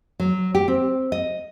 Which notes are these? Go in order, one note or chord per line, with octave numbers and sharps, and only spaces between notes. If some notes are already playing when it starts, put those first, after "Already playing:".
F#3
G4
C4
D#5